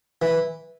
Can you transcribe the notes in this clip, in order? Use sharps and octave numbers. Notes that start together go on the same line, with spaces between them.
E3